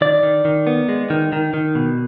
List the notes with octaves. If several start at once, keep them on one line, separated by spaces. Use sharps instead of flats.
D#3 D5
D#3
D#3
B3
G#3
D#3
D#3
D#3
B2